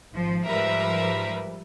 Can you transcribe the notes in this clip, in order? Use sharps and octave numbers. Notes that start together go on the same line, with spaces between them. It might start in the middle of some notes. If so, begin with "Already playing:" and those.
G#1 F3
G#2 F3 G3 A#4 B4 E5